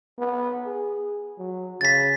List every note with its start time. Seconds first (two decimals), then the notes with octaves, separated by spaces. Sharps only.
0.19 B3
0.65 G#4
1.38 F#3
1.81 C#3 A6 B6